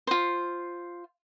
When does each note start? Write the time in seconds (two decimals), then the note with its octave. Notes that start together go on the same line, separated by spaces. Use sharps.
0.07 F4 C5